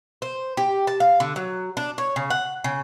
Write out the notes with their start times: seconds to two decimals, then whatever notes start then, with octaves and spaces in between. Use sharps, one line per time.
0.22 C5
0.57 G4
0.87 A5
1.00 F5
1.20 D3
1.36 F#3
1.77 D4
1.98 C#5
2.16 C#3
2.30 F#5
2.64 C#3